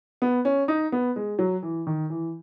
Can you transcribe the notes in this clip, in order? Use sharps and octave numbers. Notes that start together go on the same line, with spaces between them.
B3
C#4
D#4
B3
G#3
F#3
E3
D#3
E3